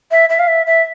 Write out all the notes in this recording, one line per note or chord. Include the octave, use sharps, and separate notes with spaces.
E5
E5
F5
E5
E5